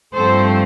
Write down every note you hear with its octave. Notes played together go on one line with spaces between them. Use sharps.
G2 F3 A3 C4 A4 C5